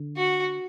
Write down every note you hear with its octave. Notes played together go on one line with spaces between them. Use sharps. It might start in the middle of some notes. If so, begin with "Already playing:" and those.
Already playing: D3
F#4